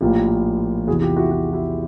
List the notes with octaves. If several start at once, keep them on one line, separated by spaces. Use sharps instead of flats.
A#1 A2 F3 A#3 F4 G4
E2 C3 E3 F#4 G#4
F4 G4
E4 F#4
E4 F#4
E4 F#4